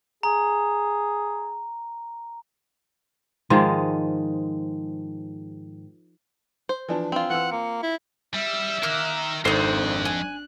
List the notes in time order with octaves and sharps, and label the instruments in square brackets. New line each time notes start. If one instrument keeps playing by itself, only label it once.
[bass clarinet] G#4 [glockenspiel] A#5
[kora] G#2 D#3 F3 G#3
[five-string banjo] C5
[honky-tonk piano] E3 F3 D4
[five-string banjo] C4 F4
[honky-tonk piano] E3 E6 [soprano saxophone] F#5
[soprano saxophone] A#3 [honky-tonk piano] C#7
[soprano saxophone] E4
[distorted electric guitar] G3 [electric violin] E5 E6
[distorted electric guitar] D#3 A#4 [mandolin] A#3 F#6
[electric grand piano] G#1 A4 C7 [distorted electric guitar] F2 [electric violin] D4 F#6 [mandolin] D#4 C5
[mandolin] G#5